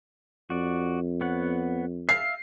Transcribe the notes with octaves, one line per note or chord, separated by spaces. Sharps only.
F2 F#4 D5
B3 C#5 F#5
E5 F5 C7